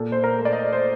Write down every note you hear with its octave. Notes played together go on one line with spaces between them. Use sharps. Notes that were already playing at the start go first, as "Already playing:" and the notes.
Already playing: A#2 A4
C5
A#4
A3
D5
D#5
C5